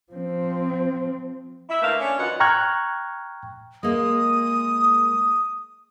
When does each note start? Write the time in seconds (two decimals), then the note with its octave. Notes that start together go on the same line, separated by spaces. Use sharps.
0.12 F3 C4
1.69 E4 E5
1.82 D3 A3 A#3 B4 E5 F5
2.01 C#4 D4
2.18 F#2 E3 D#4 F4 F#5
2.40 G5 A#5 C#6 F6 F#6 G#6
3.83 G#3 A#3 D#6